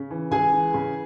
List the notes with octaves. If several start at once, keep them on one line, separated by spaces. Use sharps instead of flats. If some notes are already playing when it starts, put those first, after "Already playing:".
Already playing: C#3
E3
C#2 G#4 G#5
E3
C#3